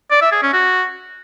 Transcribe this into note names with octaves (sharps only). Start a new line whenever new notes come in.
D5
E5
G#4
C#4
F#4